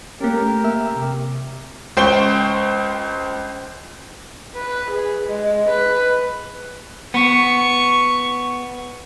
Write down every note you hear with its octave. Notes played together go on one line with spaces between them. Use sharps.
A#3 C#4 G4 A#4
A3
A#3 E5 E6
C3
C#2 C5 G5 C#6 G7
B4
G#4
G#3
B4
B3 C#6